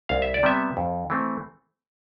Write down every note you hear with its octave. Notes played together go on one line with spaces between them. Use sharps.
C2 F5
E5
D5
C3 G3 B3 E5
F2
E3 A3 C4